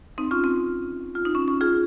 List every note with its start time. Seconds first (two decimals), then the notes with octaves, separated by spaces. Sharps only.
0.18 C4 D#4
0.31 C#4 F4
0.44 C4
1.15 F4
1.25 D#4
1.35 C#4
1.48 C#4
1.61 F4 G#4